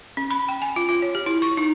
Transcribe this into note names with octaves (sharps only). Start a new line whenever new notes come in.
C#4
B5
G5
G#5
F4
F4
C#5
G4
E4
C#6
D#4